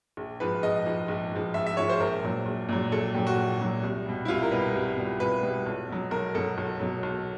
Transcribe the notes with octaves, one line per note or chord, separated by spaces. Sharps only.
A#1
G#2 F3 B4
A#1 D#5
G#2 F3
A#1
G#2 F3
A#1 E5
E5
G#2 F3 C#5
C5
A#1 A#4
A#2 F#3
A#1
A#2 F#3
A#1 A4
A#2 F#3 G4
F#4
A#1
A#2 F#3
C2
B2 G3
E4
C2 F4
A#4
B2 G3 B4
C2
B2 G3
C2 B4
B2 G3
B1
B2 F#3
B1 A#4
B2 F#3 A4
B1
B2 F#3
B1